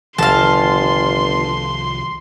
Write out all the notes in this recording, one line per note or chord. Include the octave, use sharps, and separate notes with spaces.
G1 C2 D#3 F3 F5 A5 C6